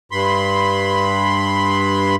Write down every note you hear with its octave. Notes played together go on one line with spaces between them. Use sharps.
G2 B5 C6